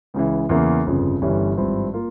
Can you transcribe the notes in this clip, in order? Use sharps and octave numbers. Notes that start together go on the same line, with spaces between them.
C#2 C#3 E3
E2 C#3 E3 A#3
G1 F2 C#3 F3
G1 G2 E3 G3 C#4
G#1 G2 F3 C4 E4
A#3 F4